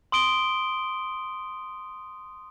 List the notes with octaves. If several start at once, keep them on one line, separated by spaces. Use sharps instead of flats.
C6 D#6 D7 G7